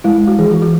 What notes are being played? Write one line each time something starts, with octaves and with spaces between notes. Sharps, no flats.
G#3 E4
G#3
F#4
E3 G#4
F#4
E3
F#4